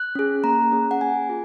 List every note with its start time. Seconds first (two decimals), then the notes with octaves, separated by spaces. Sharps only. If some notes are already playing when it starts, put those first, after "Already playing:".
Already playing: F#6
0.15 C#4 G#4
0.44 A#3 A#5
0.72 C#4 G#4
0.91 F#5
1.01 A#3 G#5
1.29 F4 G#4